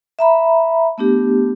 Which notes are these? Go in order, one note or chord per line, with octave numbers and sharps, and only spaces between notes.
E5 A#5 B5
A3 B3 D4 G4